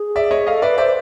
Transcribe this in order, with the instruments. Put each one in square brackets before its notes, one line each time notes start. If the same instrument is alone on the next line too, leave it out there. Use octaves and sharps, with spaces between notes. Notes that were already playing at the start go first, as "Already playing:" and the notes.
Already playing: [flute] G#4
[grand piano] D5 E5
C#5 D#5
[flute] A4 [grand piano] D#5 F5
[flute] B4 [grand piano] D5 E5
[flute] C5 [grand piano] D5 E5